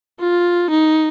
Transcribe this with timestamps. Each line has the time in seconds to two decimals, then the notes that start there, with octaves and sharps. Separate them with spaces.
0.20 F4
0.71 D#4